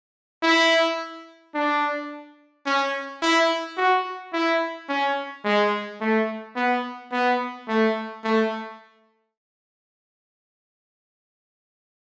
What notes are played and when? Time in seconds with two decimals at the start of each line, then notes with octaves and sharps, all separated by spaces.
0.43 E4
1.55 D4
2.66 C#4
3.22 E4
3.77 F#4
4.33 E4
4.89 C#4
5.44 G#3
6.01 A3
6.56 B3
7.12 B3
7.68 A3
8.24 A3